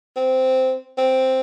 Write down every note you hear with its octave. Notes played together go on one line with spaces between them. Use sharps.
C4
C4